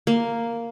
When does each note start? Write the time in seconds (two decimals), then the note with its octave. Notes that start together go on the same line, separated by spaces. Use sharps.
0.07 A#3